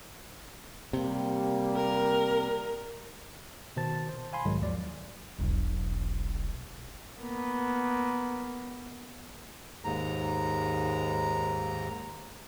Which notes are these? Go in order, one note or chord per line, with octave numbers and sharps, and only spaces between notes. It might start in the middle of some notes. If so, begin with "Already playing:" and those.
C3 G3 A#3
A#4
B2 D#3 C5 A5 A6
C5
F5 G#5 B5 C6
B1 G#2 D#3 F#3 G#3
D#2 F3 F#3 D5
E1 B1
A#3 B3
D#2 G#2 A#5